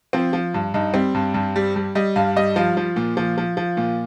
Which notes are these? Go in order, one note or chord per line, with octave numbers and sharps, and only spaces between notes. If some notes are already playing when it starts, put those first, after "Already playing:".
F3 C4
F3
G2
G2 D#4
G3 C4
G2
G2
G3
G3
G3 D#5
G2 F5
G3 D#5
F3 F5
F3
A#2
F3
F3
F3
A#2